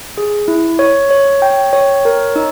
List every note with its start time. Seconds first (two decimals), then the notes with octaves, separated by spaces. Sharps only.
0.18 G#4
0.48 E4
0.79 C#5
1.11 C#5
1.42 G5
1.73 C#5
2.05 A#4
2.36 D#4